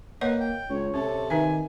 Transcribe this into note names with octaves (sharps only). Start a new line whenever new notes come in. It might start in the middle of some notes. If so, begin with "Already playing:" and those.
A#3 B4 C#5 D#5 F#5
G5
C#2 C#5
C3 C#4 A4
D#3 D#4 B4 E5 G#5